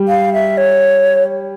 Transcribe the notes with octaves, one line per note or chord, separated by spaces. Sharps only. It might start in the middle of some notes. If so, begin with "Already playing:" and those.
Already playing: G3
F5
E5
C#5